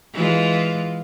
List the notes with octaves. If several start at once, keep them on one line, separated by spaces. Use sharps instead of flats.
E3 G#3 F4